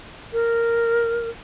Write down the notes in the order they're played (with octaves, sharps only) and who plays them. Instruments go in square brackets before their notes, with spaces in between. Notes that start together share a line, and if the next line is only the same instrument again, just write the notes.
[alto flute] A#4